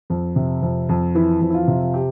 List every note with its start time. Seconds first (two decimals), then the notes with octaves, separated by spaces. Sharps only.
0.10 F2
0.36 C3
0.62 F2
0.89 F2
1.15 E3 E4
1.41 F2
1.50 E4
1.54 F4
1.68 C3
1.83 F4
1.94 G4